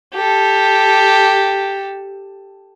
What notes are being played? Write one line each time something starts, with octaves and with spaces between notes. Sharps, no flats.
G4 A4